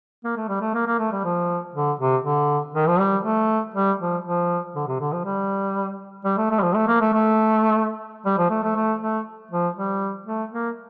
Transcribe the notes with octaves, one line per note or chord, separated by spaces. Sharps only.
A#3
A3
G3
A3
A#3
A#3
A3
G3
F3
D3
C3
D3
D#3
F3
G3
A3
G3
F3
F3
D3
C3
D3
F3
G3
G3
A3
A3
G3
F3
A3
A#3
A3
A3
G3
F3
A3
A3
A3
A3
F3
G3
A3
A#3